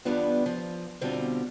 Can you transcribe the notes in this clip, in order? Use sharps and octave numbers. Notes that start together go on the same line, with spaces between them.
E2 G2 G3 B3 D4 F4
F3
B2 D3 G3 C4 F4